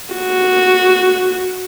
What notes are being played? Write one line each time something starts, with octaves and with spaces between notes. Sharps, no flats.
F#4